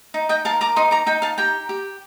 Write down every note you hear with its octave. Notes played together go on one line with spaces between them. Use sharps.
D#4
D#5 G5
A#4 F5 A5
A#5 D6
D#4 C6 D#6
A#5 D6
D#4 G5 A#5
F5 A5
G4 G5 A#5
G4